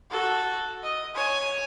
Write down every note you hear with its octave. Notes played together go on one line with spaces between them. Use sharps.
F#4 A4
D#5
C#5 G#5